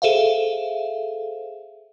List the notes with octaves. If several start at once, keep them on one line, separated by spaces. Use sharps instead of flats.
G#4 A4 C5 E5 F5